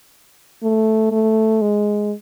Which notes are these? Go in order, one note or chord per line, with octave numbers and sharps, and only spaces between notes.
A3
A3
G#3